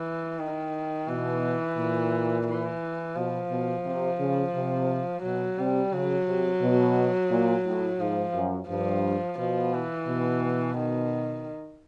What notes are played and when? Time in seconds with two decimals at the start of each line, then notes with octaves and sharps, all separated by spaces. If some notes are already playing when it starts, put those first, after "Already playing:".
Already playing: E3
0.38 D#3
1.08 B2 E3
1.78 A#2
2.47 E3
3.15 B2 F3
3.51 B2
3.85 C3
4.19 C#3
4.54 C3
5.23 B2 F#3
5.58 C3 G3
5.92 C#3 F#3
6.27 C3
6.62 B2
7.30 A#2
7.65 A2
8.00 G#2 F3
8.34 F#2
8.68 G2 F3
9.38 B2 F3
9.73 E3
10.07 B2
10.77 D#3